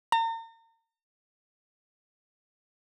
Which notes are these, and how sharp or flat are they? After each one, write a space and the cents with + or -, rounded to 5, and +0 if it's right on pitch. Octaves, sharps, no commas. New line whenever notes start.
A#5 -40